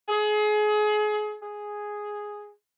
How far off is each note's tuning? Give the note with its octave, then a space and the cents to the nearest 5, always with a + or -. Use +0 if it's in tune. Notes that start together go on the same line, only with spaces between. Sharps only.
G#4 +30
G#4 +0